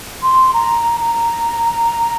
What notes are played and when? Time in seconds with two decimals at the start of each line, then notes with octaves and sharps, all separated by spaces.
0.23 C6
0.54 A#5
1.01 A#5